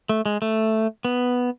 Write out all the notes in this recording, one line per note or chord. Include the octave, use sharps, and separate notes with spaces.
A3
G#3
A3
B3